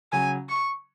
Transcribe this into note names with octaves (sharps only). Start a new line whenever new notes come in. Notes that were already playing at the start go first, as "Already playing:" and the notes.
C#3 F#3 G#5
C#6